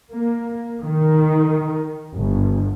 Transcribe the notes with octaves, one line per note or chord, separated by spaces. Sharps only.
A#3
D#3
G1